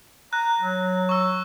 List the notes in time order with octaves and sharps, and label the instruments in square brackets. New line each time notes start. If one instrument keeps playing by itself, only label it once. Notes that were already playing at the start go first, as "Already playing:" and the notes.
[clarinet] A#5 [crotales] F#6
[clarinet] F#3
[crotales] C#6 E6